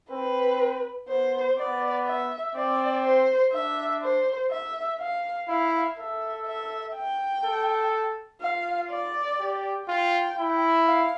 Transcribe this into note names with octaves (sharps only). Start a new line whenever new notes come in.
C4 B4
B3 C5
B3 D5
E5
C4 D5
C5
D4 E5
C5
E5
F5
E4 F5
A4 E5
E5
G5
A4
F4 F5
D5
G4
F4 G5
E4
F5